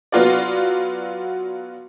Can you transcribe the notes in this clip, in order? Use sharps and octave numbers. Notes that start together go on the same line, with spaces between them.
F#3 B3 F4 F#4 D5